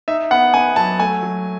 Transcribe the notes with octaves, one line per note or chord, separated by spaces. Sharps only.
D#4 E5
B3 F#5
B3 G#5
F#3 A5
A3 G#5
F#3